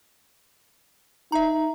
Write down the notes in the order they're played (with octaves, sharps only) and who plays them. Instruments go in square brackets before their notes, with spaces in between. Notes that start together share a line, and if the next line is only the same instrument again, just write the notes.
[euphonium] D#4 [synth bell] E5 A#5